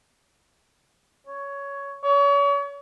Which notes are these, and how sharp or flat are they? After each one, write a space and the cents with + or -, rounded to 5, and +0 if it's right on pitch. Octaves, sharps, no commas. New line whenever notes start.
C#5 +10
C#5 +35